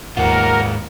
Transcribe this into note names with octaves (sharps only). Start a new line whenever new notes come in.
D#2 G#2 F4 A#4 F#5